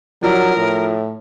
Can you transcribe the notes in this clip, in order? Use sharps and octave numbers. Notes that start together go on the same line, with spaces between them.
F3 F#3 D4 E4 A#4
A2